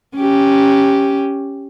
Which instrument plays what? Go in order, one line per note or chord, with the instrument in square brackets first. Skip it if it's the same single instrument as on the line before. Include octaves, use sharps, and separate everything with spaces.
[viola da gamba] C#4 G4